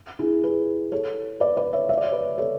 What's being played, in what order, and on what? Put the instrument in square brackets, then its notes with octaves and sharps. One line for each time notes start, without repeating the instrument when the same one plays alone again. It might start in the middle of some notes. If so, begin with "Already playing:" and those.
[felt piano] E4 G#4
G#4 B4
A4 C#5
B4 D5
B4 D5
C#5 E5
E5
D5
C#5
B4 D5
A4 C#5